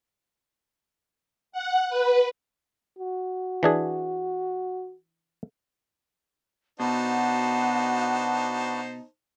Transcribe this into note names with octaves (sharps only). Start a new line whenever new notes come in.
F#5
B4
F#4
E3 D4 G#4
B2 B3 D4 D#4 F#4 C5 F#5 A5